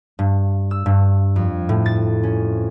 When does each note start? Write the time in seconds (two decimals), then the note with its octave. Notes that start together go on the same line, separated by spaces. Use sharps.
0.19 G2
0.71 E6
0.86 G2
1.36 F2
1.69 A2
1.86 A6
2.23 C#4